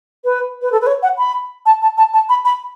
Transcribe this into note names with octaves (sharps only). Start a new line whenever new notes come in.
B4
B4
A4
B4
C#5
F#5
B5
A5
A5
A5
A5
B5
B5